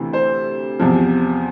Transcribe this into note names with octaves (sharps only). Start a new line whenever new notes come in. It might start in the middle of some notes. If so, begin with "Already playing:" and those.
Already playing: D2 C3 E3
C5
E2 C3 F3